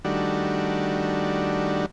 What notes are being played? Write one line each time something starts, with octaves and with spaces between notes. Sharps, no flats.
D#3 G3 A3 D4 F#4